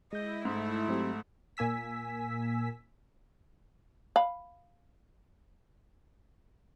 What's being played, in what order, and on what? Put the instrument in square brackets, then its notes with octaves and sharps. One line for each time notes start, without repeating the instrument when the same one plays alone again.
[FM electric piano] G#3 G6 [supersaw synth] E4 [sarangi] D#5
[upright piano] G#2 [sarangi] A3
[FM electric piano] F#3 C4 G4
[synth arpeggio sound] A#2 A#3 G#5 E6 B6
[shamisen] F5 B5